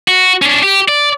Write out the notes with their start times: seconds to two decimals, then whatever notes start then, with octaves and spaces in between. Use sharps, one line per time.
0.08 F#4
0.42 C#4 D4
0.63 G4
0.88 D5